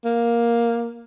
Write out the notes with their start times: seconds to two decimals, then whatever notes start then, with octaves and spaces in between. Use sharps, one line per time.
0.05 A#3